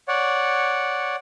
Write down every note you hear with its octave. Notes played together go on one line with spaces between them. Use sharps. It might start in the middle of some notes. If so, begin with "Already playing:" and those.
C#5 D5 F#5